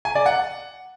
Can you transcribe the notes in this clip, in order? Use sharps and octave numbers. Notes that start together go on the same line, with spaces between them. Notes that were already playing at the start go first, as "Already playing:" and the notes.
G#5
D5
F#5